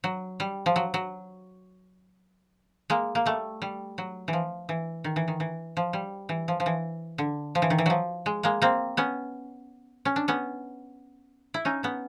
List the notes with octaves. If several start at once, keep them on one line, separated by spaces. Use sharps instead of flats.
F#3
G3
F3
F#3
F#3
G#3 A#3
A#3
G3 A3
G3
F#3
E3
F3
E3
D#3
E3
D#3
E3
F3
G3
E3
F3
F3
E3
D3
F3
E3
D#3
E3
F3 F#3
G#3
G#3 A#3
A#3 C4
B3 C#4
C#4
D4
B3 C#4
E4
C#4 D#4
B3 C#4